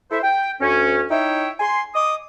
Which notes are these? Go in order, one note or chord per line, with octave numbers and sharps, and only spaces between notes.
E4 A4 C5 E5
G5
D2 C#4
D#4 E4 C#5 E5 G5
G#5 C6
D#5 D6 D#6